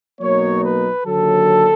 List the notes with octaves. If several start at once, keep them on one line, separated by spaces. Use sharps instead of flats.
B2 F#3 A#3 D#4 C#5
B4
D#2 D3 F#3 A4